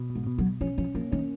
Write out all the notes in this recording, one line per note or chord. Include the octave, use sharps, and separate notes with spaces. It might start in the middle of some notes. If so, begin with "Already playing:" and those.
Already playing: B2
B2
G#2
B2
F#3
B2
F3 C#4
F3 C#4
F3 A#3
D#3 C#4